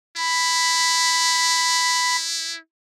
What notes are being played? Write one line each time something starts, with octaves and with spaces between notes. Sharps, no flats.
E4 B5